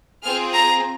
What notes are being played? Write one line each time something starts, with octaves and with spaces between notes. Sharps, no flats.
C4 F4 G#4 F6
A#5